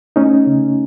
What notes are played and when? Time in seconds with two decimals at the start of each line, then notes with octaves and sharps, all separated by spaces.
0.16 A3 C#4 D#4
0.47 C#3